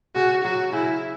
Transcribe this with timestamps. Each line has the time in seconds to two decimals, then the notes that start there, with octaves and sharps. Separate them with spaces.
0.15 C#3 F#4
0.44 F#3 F#4
0.73 C#3 E4